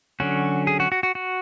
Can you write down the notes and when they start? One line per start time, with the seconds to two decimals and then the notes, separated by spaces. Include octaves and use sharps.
0.20 D3 F#3 C#4 F#4
0.67 G#4
0.80 F#4
0.92 F#4
1.03 F#4
1.15 F#4